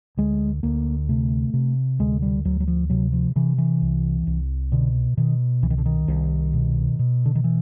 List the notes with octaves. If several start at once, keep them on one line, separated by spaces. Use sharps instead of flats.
D2 G#3
D2 A#3
C3 A3
C3
D2 G#3
G3
D2 F#3
F#3
F3
C3 F#3
F3
C3 E3
E3
C2
C2
B2 D3
B2 D#3
C2 E3
D#3
D3
D#3
C2
B2
B2
D3
D#3
E3